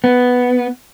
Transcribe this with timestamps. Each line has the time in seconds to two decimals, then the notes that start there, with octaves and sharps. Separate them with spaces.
0.04 B3